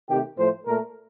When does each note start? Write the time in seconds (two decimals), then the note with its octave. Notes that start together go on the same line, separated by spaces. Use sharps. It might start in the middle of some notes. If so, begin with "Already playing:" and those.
0.09 C3 D#3 A3 G4
0.38 A2 F3 A3 C5
0.67 A#2 A3 A#4